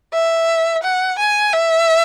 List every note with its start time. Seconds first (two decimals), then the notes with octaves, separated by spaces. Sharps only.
0.13 E5
0.83 F#5
1.18 G#5
1.53 E5